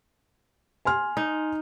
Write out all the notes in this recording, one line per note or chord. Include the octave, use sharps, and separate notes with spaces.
G#5 C6 F6
D#4